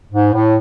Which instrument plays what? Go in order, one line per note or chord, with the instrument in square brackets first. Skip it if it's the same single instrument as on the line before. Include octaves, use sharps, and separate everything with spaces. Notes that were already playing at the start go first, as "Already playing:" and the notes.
[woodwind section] G#2
A2